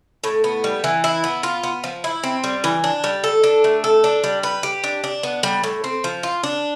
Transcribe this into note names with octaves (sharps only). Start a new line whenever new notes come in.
A2
B3
G3
E3
E4
B3
F4
B3
F3
E4
C4
G3
E3
D4
G3
A4
D4
A3
A4
D4
G3
B4
G4
D4
D4
B3
G3
A2
C4
F3
F4
D4